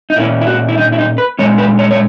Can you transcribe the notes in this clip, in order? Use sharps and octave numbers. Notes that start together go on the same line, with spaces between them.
D#4
A#2 A#3 C#4 E4
E4
F#4
E4
D#4
E4
D#4
B4
A#2 G#3 C#4 C#5
B4
C#5
C#5